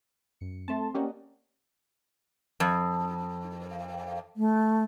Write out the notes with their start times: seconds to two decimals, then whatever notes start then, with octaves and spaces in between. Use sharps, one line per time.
0.41 F#2 C#7
0.68 A3 C4 A5 C6
0.94 A#3 C#4 G4 D5 D#5 F#5
2.60 F2
4.37 A3